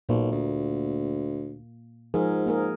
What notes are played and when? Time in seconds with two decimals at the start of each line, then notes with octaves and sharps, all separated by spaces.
0.09 B1 A#2 A#3
0.31 D2
2.14 G#2 F3 G#4 A#4
2.46 A#3 G#4 A#4